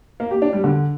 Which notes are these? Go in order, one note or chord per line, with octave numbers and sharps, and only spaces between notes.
A#3
G4
D4
G3
D3